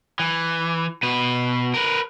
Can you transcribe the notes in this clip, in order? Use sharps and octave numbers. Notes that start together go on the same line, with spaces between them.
E3
B2 B4
A#4 B4